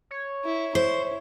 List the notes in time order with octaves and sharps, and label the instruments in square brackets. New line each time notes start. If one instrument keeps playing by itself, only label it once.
[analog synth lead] C#5
[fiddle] E4
[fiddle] E4 [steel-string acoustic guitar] C5